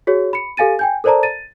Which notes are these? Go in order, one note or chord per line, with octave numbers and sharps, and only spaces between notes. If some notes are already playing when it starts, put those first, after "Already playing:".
F#4 G#4 C#5
B5 C#7
G4 A4 F5 G#5 A6 D#7
G5 G#5 G6
A4 A#4 C5 D5 A5 A#5
A6 D#7